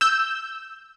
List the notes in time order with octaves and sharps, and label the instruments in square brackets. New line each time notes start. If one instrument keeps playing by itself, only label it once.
[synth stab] E6 G6